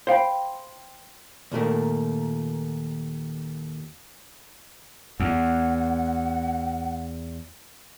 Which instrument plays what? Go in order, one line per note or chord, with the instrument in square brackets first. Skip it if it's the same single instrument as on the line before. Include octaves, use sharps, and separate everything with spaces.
[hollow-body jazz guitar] C5 F5 G5 B5
D#2 A#2 A3 A#4
[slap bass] E2 [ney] F#5